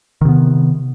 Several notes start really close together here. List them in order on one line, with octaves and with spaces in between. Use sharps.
D#3 C3 B3